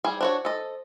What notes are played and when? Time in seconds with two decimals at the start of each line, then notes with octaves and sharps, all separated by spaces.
0.05 G3 G#4
0.21 D4 F#4 C5 C#5
0.45 A4 D#5